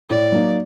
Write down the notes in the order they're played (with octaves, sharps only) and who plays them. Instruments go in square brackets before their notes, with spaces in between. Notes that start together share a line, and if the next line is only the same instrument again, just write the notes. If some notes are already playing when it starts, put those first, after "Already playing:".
[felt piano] A2 [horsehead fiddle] D5
[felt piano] F#3 A#3 D#4